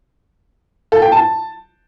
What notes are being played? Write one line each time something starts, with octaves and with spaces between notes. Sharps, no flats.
A4
G5
A5